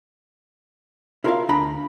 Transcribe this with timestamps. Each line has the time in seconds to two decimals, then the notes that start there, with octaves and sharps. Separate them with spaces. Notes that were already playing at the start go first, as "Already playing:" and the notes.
1.24 E4 F4 A#4 C#5 E5 F5
1.49 D2 D4 A#5 B5